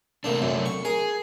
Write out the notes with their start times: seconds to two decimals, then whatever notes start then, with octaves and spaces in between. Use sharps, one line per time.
0.24 C3 A3 A#3 C4 D4
0.42 F#2
0.66 C#6
0.85 G#4 A#4